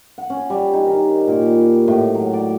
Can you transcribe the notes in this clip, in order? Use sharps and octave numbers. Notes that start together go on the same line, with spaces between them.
F#5
C#4
G3
D#4
D#3
A#2
G4
A2
F#3
D5